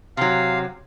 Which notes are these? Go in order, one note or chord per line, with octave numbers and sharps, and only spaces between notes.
C3 F#3 F5